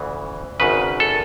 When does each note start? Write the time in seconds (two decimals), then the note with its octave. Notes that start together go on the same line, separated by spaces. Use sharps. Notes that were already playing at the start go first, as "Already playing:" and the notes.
Already playing: D2 C#3 E3
0.60 G#1 F#2 C#3 B4
1.00 A4